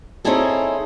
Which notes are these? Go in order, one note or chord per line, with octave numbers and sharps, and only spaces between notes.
C4 C#4 D#4 E4 G#4 A4